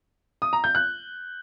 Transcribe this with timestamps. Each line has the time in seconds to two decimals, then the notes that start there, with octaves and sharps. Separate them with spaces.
0.42 D#6
0.53 A#5
0.64 G6
0.75 F#6